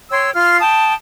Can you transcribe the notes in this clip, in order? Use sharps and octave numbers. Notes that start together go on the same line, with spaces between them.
C#5 G5 C6 E6
F4 C6 F6
G5 A5 D#6